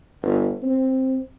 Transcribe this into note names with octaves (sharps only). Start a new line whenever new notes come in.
G1
C4